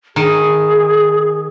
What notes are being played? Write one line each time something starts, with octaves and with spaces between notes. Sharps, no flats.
D#3 G#4